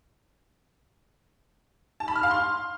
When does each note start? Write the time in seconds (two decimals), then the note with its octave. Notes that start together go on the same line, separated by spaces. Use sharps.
2.00 A5
2.08 B5
2.16 F6
2.23 F5
2.31 C6